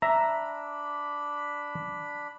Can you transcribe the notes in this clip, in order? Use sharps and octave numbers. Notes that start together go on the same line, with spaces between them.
D4 E5 A#5 B5